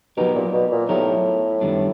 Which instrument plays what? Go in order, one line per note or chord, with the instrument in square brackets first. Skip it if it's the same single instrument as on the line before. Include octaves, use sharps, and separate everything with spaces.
[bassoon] B2 [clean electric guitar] F#3 B3 D#4 G4 A#4
[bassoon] A#2
B2
A#2
[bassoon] A2 [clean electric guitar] F#3 B3 D#4 G4 A#4
[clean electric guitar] F#2 D#3 G3 B3 D4